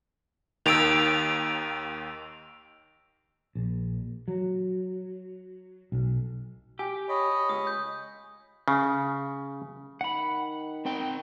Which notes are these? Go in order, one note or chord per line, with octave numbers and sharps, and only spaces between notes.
D#2 D#3 E6 D7 F7
A#1
F#3
B1
G4 G#5
C#5 D#5 B5
C#2 D#6
G6
C#3
D#3 F#5 B5
C4 A#4 G5